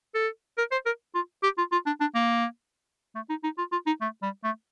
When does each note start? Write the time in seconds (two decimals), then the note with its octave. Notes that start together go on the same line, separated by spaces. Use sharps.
0.15 A4
0.58 A#4
0.72 C5
0.86 A#4
1.15 F4
1.43 G4
1.58 F4
1.72 F4
1.86 D4
2.01 D4
2.15 A#3
3.15 A3
3.29 D#4
3.44 D#4
3.58 F4
3.72 F4
3.86 D#4
4.01 A3
4.22 G3
4.44 A3